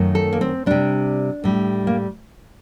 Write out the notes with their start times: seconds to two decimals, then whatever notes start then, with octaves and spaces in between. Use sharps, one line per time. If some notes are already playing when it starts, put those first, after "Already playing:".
Already playing: F#2 D#3 A3
0.15 A4
0.33 A#3
0.41 C4
0.66 C3 G3 D4
1.44 A2 G3
1.87 A#3